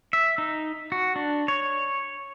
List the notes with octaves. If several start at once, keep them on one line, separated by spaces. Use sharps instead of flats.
E5
D#4
F#4
D4
C#5